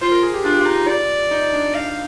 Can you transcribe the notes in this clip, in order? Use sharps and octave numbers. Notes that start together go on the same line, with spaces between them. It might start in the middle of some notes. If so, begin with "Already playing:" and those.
F4 C5
A#4
G#4
G4
D4 F4
G4
F4
D#4
D5
D#4
D4
F5